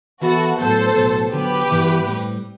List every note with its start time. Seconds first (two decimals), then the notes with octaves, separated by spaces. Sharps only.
0.22 E3 B3 E4 F#4 A4
0.59 A2 F#3 B3 A4 C5
0.96 B1 A2 F#3 B3
1.32 D3 F#3 B3 G4 B4
1.70 G2 E3 G3 B3 E4
2.06 A2 G3 C4